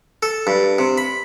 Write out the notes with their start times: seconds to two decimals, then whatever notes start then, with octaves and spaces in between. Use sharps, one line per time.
0.23 A4
0.47 G2
0.79 C3
0.98 B5